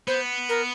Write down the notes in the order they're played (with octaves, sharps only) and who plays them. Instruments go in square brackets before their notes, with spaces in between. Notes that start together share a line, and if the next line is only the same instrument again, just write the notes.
[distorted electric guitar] B3 [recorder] C5
[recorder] A#4